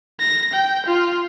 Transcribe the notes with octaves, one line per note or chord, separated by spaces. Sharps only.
A#6
G5
F4